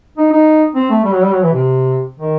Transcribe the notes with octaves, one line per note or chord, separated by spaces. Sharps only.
D#4
D#4
C4
A3
G3
F#3
G3
F#3
E3
C3
D#3